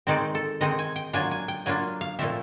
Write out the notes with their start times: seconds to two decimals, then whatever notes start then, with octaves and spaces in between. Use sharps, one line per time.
0.07 D#3 G#3 C4 D#4 D5
0.35 A4
0.61 D#3 G#3 C4 D#4 D#5
0.79 G#5
0.96 G5
1.13 F#3 A#3 D4 F4 G#5
1.31 G#5
1.48 G5
1.66 F#3 A#3 D4 F4 G#5
2.01 F5
2.19 A#2 F3 A3 C4 E5